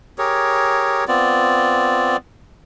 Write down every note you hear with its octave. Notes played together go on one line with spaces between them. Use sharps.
G4 G#4 A#4 C#5
B3 C4 F4 D5